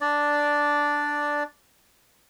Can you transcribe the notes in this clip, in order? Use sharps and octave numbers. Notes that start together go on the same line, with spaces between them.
D4 D5